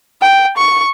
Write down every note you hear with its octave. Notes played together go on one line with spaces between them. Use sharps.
G5
C#6